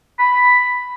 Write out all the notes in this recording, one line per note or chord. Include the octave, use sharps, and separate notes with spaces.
B5